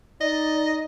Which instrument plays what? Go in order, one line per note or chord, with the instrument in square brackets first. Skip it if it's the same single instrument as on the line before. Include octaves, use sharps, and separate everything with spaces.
[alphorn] D#4 [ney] D5 [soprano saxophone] D#5